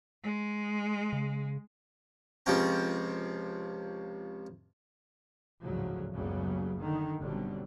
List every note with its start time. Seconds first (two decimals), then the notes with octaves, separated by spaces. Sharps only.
0.24 G#3
1.13 C#3
2.46 C#2 C3 F3 C#4 G5 A#5
5.62 A1 D2 G#2 C#3 F3 F#3
6.14 F#1 C#2 C#3 F#3 G3 B3
6.78 D3 D#3
7.19 G1 B2 D3 F#3 G3 C4